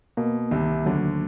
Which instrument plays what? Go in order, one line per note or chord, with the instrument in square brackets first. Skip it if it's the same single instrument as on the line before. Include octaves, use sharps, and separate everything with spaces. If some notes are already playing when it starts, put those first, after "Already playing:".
[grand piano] B2 [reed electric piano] A#3
[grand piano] C2 C3 [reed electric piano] D#3
[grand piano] D2 D3 [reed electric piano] F#3